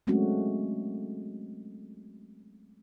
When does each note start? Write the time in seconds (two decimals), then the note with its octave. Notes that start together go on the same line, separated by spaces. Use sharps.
0.07 F#3 G#3 A3 C4 C#4 F#4